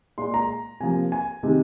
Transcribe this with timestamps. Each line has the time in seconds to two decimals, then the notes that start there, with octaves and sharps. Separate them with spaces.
0.18 A#2 G#3 C6
0.34 A#5
0.80 C3 F3 A#3 G#5
1.12 G#5
1.43 C3 D#3 G#3